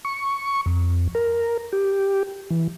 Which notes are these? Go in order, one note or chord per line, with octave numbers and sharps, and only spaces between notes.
C#6
F2
A#4
G4
E3